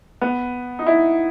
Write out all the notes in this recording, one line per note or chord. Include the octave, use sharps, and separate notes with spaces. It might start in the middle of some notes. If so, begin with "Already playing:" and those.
B3
D#4
E4